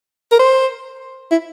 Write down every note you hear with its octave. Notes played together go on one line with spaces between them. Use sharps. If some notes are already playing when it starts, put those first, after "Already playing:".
A#4
C5
E4